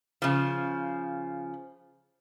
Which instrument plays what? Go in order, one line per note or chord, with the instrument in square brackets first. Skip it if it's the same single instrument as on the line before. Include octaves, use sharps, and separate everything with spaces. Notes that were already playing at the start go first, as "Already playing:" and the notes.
[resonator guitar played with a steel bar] C#3 F3